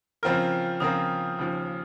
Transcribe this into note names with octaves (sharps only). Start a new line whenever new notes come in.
C#3 F3 C4 F4 A#4 F6
C#3 F3 C4 F4 A#4 D#6
D#2 C#3 F3